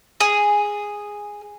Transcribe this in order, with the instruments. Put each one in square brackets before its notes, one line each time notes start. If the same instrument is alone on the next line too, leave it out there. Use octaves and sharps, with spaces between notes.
[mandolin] G#4